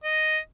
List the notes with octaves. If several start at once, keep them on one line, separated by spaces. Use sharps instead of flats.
D#5